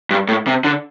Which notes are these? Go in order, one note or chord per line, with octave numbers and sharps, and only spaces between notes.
G2
A2
C3
D3